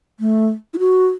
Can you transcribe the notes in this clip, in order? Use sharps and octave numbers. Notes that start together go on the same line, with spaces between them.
A3
E4
F#4